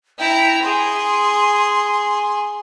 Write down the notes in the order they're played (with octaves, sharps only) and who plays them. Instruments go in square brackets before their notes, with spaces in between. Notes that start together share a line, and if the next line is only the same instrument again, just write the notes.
[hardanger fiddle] E4 A#5 [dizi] G5
[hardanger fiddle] G#4 [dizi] C6